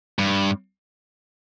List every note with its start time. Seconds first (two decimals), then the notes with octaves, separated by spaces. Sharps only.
0.19 G2